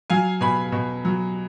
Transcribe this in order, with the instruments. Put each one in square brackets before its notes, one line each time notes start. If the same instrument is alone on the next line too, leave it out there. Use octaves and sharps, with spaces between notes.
[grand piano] F#3 F5 G#5
B2 G#5 B5
B2
F#3